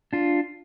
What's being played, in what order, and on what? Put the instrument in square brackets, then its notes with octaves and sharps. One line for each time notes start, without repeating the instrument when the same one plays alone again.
[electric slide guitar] D4 F4